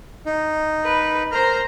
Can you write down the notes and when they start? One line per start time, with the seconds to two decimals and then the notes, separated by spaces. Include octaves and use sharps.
0.26 D#4
0.84 B4
1.32 A#4 C5 A#5 F6